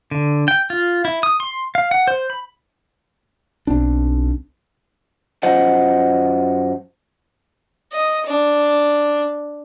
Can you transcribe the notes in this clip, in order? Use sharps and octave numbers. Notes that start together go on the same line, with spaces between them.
D3
G5
F4
E4
D#6
C6
F5
F#5
C5
B5
B1 C4 D4
F#2 F4 C5 D#5 F#5
D#5
D4